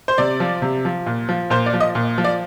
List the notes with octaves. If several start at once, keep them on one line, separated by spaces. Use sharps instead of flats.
C5
C3 D5
F3
C3
F3
A#2
F3
A#2 C5
D5
F3
D#5
A#2
F3
D5